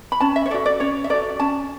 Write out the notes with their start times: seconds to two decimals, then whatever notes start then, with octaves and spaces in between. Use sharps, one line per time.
0.12 B5
0.20 C#4 A5
0.36 E5
0.46 C#5
0.50 A4 D5
0.54 F#4
0.66 D5
0.80 C#4 C#5
1.04 E5
1.10 F#4 A4 D5
1.39 C#4 A5